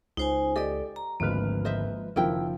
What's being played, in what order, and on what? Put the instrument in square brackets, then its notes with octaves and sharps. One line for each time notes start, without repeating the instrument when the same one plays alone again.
[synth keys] C#2 [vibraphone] D#4 C5 G#5
[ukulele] G4 D#5 [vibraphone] A4 D5
[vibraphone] A#5
[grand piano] G#1 D2 F6 [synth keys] F3 G#3 B4 [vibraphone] A#3
[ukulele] C5 D#5 E5
[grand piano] F#1 D#3 F3 [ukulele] E4 A#4 G5